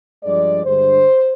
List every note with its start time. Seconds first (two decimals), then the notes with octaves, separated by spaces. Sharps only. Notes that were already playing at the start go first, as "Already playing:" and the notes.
0.23 G2 F3 G#3 D5
0.64 G2 D3 G#3 C5